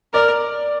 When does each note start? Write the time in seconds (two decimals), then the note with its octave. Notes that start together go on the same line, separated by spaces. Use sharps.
0.13 A#4 D5